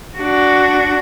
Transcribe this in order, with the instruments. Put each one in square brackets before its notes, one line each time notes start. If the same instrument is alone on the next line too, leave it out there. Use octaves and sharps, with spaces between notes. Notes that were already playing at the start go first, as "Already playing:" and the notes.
[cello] D4 F#4